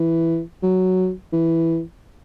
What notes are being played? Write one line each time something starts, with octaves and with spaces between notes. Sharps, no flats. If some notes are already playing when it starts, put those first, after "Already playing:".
Already playing: E3
F#3
E3